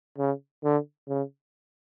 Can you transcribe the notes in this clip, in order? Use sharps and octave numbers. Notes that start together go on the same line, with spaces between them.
C#3
D3
C#3